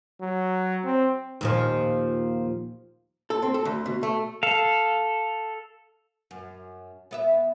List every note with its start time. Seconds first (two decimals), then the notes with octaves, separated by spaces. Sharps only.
0.22 F#3
0.85 C4
1.41 D#2 A#2 F3
3.30 A4
3.43 C4
3.54 A4
3.65 D2
3.86 B2
4.03 A3
4.43 A4 F5
6.31 F#2
7.11 B3 D#5 E5